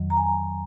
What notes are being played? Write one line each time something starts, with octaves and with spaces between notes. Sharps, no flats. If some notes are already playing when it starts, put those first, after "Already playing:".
Already playing: F2 D#3 F#3
A#5
G#5